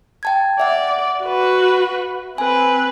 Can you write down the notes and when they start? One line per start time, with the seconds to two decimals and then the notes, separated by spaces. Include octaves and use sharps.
0.23 G5 A5 G#6
0.60 D5 E5 F#5
1.23 F#4 B4
2.38 C4 B4 G#5